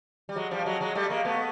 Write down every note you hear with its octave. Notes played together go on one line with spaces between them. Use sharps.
G3
F#3 G#3
F3 G3
F#3 G#3
F#3 G#3
G3 A3
G#3 A#3
A3 B3